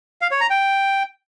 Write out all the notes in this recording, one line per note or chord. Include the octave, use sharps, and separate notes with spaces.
F5
C#5
A#5
G5